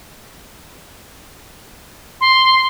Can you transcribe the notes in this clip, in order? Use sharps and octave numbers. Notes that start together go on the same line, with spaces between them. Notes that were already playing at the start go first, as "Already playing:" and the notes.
C6